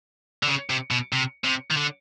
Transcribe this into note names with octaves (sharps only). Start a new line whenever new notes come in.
D3
C#3
C3
B2
C3
C3
D#3
D3